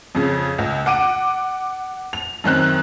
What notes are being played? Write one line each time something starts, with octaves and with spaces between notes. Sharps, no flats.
F2 C#3
C#2
F#5 D6 D7 D#7
F7
F#2 D#3 C4 F#6